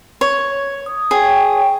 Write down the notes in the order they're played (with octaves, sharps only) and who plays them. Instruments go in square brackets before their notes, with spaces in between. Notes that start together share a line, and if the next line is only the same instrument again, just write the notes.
[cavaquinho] C#5
[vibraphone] D#6
[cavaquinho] G#4 [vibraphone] C#5 G5 C#6